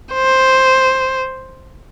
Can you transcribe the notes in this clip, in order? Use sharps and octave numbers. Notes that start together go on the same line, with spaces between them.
C5